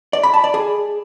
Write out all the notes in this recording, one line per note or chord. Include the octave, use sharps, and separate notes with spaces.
D5
B5
A5
D5
G#4